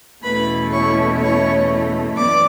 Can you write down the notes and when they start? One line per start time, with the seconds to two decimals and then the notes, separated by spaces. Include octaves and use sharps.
0.23 E2 B2 A3 C#4 E4 B4 B5
0.72 C#5 C#6
1.19 C#5 C#6
2.16 F#2 E3 B3 D5 D6